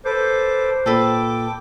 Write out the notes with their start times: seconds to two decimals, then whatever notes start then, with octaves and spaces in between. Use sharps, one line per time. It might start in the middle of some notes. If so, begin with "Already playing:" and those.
0.05 A4 B4 C5 D6
0.86 A#2 A4 B4 G5 D6